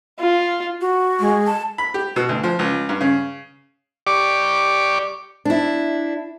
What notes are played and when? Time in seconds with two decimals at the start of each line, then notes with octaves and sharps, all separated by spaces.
0.20 F4
0.81 F#4
1.20 G#3
1.47 A5
1.78 B5
1.94 G4
2.16 B2
2.29 D2
2.43 F3
2.59 C#2
2.89 G2
3.01 C#3
4.07 G4 D5 C#6 D6
5.45 D4 E4